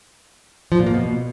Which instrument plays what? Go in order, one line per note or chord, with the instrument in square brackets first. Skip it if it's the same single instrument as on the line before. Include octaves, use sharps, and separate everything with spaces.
[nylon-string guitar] F3
A#2
A#3
B2